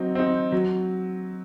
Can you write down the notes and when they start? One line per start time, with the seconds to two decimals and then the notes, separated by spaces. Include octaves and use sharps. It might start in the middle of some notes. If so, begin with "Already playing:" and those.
Already playing: F#3 C4 D#4
0.15 C4 D#4
0.52 F#3